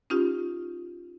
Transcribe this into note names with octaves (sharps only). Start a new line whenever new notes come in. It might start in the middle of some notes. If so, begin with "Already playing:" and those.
C#4 D#4 F4 G4